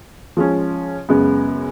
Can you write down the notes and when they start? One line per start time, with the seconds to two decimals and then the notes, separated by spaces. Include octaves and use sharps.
0.37 F3 G#3 C#4
1.09 F#2 C#3 G#3 B3